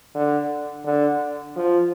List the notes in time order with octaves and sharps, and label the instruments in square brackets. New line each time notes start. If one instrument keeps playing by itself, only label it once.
[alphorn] D3
D3
F3